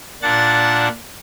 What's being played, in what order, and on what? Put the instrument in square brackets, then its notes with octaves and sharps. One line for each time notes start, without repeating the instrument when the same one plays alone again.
[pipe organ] A#2 D4 F#5 A5 A6